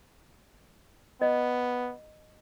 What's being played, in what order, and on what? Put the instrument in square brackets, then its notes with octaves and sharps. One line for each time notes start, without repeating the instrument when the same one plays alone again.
[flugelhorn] B3 [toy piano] D#5